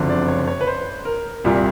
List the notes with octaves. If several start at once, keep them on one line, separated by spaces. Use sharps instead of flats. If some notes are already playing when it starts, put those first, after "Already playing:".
Already playing: F#1 F2 D3
D5
C#5
C#5
B4
C5
A#4
C2 A#2 G3 A#3